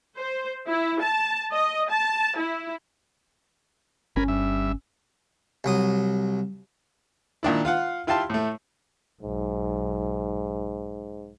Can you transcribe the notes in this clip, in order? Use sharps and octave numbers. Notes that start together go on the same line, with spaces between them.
C5
E4
A5
D#5
A5
E4
G1 C#4 A#4 G#5 B5
G2 E5
C2 F#3 D#6
A#2 D#3 D4 E4
F4 F5 F#5
E4 F4 G4 F5 A5 C6
A2 A3
B1 G#2